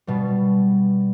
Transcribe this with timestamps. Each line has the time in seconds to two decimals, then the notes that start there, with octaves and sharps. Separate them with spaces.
0.07 B2 G3